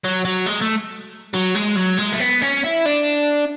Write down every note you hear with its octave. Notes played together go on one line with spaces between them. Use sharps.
F#3
F#3
G#3
A3
F#3
G#3
F#3
G#3
A3
B3
C#4
E4
D4